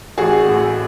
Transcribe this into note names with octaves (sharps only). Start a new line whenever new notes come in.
A1 F#4 G#4
A2